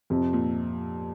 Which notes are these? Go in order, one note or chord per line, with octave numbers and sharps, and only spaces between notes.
F2 C3
A#2